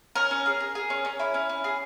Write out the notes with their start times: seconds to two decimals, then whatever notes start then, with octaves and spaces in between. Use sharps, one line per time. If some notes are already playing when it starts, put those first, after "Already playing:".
0.15 C#4 A#4
0.31 C#4
0.46 G#4
0.60 G#4
0.75 G#4
0.90 C#4
1.05 C#4
1.19 E4
1.34 C#4
1.49 C#4
1.64 G#4